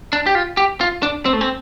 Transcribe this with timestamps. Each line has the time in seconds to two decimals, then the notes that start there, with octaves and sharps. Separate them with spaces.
0.13 D4
0.26 G4
0.35 F4
0.57 G4
0.81 F4
1.03 D4
1.25 C4
1.33 A3
1.41 C4